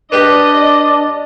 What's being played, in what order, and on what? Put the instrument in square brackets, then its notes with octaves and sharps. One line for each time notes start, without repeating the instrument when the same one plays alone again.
[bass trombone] D4 [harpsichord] G4 B4 [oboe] D5 [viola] D#5